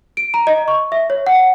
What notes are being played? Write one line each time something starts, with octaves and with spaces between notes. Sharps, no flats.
D7
A#5
D#5
C#6
E5
C#5
F#5